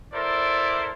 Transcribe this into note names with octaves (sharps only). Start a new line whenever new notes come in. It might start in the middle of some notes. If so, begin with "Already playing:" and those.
E4 A4 A#4 C5 D5